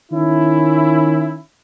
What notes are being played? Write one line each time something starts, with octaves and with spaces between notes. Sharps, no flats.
D#3 C#4 E4